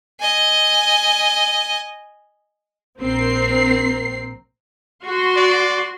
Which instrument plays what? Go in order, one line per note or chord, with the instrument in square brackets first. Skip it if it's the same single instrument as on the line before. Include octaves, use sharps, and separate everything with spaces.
[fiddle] D#5 G#5
[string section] A#1 C4 A#4 C7
[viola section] F#4 C6
[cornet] D5